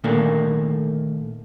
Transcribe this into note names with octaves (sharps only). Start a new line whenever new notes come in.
A#2 D3 D#3 A3 A#3